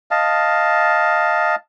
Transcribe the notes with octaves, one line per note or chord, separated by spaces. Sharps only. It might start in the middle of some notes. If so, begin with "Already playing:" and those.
D#5 F5 A5